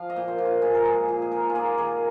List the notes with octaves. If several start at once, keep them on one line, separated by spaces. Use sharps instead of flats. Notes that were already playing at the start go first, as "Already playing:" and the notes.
Already playing: F3 F5
D#5
A#2
C5
A#2
F4
A#2 G#4
A#4
G#3 G#4
A#2
G#4
D#4 A#4
F4
A#3 G#4
D#3 G#4